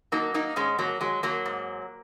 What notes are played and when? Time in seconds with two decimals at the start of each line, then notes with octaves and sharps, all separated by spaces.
0.12 F#3 A#3 D#4
0.34 A#3 D#4
0.56 G#2 G#3 C#4
0.79 F#3 A#3
1.01 F#3 G#3
1.23 F#3 A#3
1.46 G#2